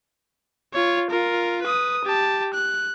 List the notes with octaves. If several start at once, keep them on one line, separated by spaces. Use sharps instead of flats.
F4 C#5
F4 A#4
B4 D#6
G4 A5
F#6